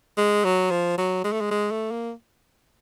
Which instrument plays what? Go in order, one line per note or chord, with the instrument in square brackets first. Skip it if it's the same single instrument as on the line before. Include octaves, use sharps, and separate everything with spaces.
[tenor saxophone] G#3
F#3
F3
F#3
G#3
A3
G#3
G#3
A3
A#3